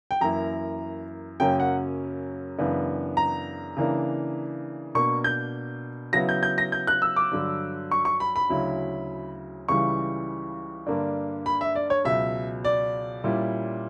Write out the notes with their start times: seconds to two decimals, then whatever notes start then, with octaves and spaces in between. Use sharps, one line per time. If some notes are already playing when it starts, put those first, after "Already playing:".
0.11 G5
0.21 F#2 E3 A#3 E4 A#5
1.40 F#2 C#3 F#3 A#3 C#4 G5
1.60 F#5
2.58 F#2 C#3 E3 B3 D4
3.17 A#5
3.76 C#3 E3 A#3 D4
4.95 B2 A#3 D4 C#6
5.24 G6
6.13 C#3 F#3 B3 E4 A#6
6.29 G6
6.43 G6
6.58 A#6
6.72 G6
6.87 F#6
7.02 E6
7.16 D6
7.31 G2 D3 F#3
7.91 C#6
8.05 C#6
8.20 B5
8.36 B5
8.50 D2 C#3 F#3 C#4 E4
9.68 C#2 C#3 E3 G3 C#6
10.87 G2 D3 A#3 D4
11.46 B5
11.61 E5
11.75 D5
11.90 C#5
12.05 C#2 B2 F#3 E5
12.64 D5
13.24 A#2 G3 C#4 E4